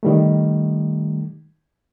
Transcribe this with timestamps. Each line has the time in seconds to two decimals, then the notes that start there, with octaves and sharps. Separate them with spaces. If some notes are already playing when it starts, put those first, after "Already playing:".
0.03 D#3 G3 A3